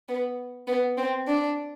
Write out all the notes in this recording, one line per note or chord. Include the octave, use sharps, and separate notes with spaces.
B3
B3
C4
D4